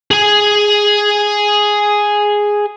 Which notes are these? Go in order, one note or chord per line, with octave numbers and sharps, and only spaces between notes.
G#4 G#5